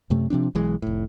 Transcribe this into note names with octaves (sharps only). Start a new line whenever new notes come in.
F#2 C3 A3
C3 F3 C4 D4
B1 E3 G#3
F1 A2